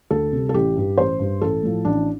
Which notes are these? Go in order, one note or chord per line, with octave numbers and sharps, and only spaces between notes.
D2 A4
C3 G3
A4
A1 G4
G2 G3
A1 C5
G2 G3
A1 A4
A2 F3
A1 D4